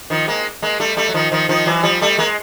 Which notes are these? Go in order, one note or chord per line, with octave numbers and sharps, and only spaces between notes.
D#3 F3
G#3 A#3
G#3 A#3
G3 A3
G3 A3
F#3
D#3 F3
D#3 F3
D#3 F3
E3 F#3
F3 G3
G3 A3
G#3 A#3